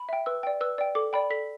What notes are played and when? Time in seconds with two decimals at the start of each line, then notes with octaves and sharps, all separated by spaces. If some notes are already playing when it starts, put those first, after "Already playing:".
Already playing: B5
0.09 E5 G5
0.26 B4 E6
0.43 D5 G5
0.61 B4 E6
0.78 D5 G5
0.95 A4 D6
1.13 D5 G5 B5
1.30 A4 B6